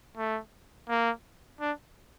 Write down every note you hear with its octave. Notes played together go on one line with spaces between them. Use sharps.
A3
A#3
D4